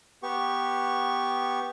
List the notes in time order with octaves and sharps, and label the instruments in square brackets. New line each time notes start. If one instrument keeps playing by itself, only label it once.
[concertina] B3 G4 C#6